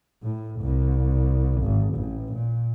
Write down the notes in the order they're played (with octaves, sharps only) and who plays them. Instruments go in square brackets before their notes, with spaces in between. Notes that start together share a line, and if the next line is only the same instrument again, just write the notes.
[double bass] A2
C2
G#1
A1
A#2